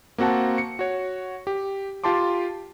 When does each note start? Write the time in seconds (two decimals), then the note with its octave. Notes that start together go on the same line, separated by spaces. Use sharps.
0.18 A#3 C4 F#4 F#5 A5
0.58 C#7
0.79 F#4 C#5
1.47 G4
2.04 F4 G4 A5 C6 D6